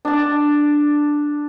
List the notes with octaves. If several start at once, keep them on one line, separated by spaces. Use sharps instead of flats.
D4 A5